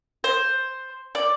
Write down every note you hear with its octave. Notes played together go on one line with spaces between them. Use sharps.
C5
D5